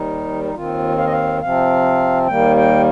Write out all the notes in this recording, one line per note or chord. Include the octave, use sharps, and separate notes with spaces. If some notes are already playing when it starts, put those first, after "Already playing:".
Already playing: D#2 D#3 G3 D#4
D#4
D#2 D#3 C4 F4
F5
D#5
F5
C3 F3 C4 F5
D#2 D#3 G3 A#3 G5
G5